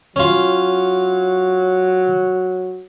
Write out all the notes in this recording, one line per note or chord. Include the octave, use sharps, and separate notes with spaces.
F#3 C#4 F4